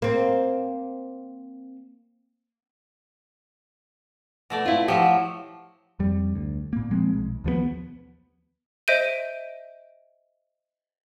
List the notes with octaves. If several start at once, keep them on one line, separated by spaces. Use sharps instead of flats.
A#3 C4
B2 A3 D5
E4 F4
F3 F#3 G4
F2 G3
D2
A#2 A#3
A#2 F3 G#3 C4
B1
D#2 F3 F#3 B3
C5 D#5 E5 G6 D7 D#7